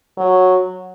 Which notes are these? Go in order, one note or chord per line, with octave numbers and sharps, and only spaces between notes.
F#3